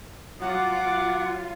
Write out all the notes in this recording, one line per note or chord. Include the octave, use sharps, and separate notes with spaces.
F#3 F4 F#5 D6